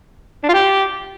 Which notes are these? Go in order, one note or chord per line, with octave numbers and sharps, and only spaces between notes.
D4
F4
G4